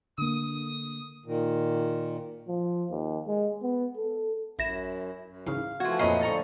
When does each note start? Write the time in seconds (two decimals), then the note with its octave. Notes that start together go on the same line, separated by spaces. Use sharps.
0.18 D3 A#3 D#6
1.26 A#2 D#3
2.48 F3
2.90 D#2
3.27 G#3
3.62 B3
3.97 A4
4.59 A1 F#2 E4 A#6 E7
5.24 F#2
5.46 G#2 C#3 E3 F5
5.80 E3 F3 A3 F4 F#4 G#6
5.99 F2 A#2 C5 C#5 D#5 F#5 B5 C7
6.21 A2 D3 F3 A4 A#5 C#6